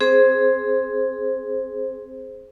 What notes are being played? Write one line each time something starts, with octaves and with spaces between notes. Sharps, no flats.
C4 G#4 C5